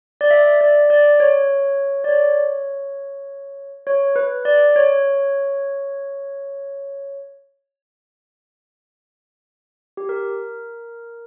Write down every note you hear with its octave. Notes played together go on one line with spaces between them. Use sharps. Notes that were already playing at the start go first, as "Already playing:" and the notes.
D5
E5
D5
D5
C#5
D5
C#5
C#5
B4
D5
C#5
G4
A#4